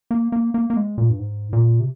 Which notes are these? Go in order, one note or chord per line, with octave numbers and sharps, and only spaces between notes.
A#3
A#3
A#3
A#3
G#3
A#2
G2
G#2
A#2
C3